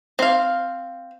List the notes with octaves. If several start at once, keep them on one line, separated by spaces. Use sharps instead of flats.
C4 F5